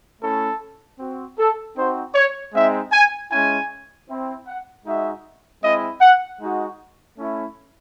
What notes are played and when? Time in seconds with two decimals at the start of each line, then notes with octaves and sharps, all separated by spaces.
0.22 A3 C#4 E4 A4
0.99 C4 F#4
1.39 A4
1.77 C4 D#4 F#4 C5
2.15 C#5
2.54 G#3 C4 D#4 E5
2.92 G#5
3.31 G#3 C#4 E4 G#5
4.09 C4 E4
4.47 F#5
4.86 G#3 D#4 F#4 E5
5.63 G#3 C4 E4 D#5
6.01 F#5
6.41 G#3 D#4 F#4
7.18 A3 C#4 E4